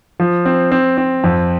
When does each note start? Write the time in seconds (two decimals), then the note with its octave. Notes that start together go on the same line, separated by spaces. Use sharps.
0.20 F3
0.46 C4
0.72 C4
0.98 C4
1.24 F2